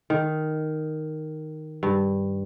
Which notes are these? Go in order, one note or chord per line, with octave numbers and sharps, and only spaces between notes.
D#3
G2